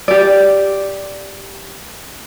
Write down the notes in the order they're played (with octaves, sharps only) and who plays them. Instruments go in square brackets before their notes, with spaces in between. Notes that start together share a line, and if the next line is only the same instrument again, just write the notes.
[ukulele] G4 D5